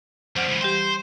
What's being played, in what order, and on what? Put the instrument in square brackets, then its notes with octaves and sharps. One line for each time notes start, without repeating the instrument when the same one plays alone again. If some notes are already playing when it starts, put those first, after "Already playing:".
[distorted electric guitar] F2 G3 [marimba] C5 F#5 F6
[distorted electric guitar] C#2 E3
[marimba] E3 G3 G4 [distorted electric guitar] C5